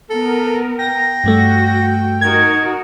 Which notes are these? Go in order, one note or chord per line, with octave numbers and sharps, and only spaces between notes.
B3 A4 A#4
G5 A#6
G2 G3 A3 F#4
D#4 F#4 A#4 G#6